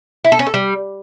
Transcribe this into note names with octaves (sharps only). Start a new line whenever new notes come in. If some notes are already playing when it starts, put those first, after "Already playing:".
E4
A4
C#4
A4
G3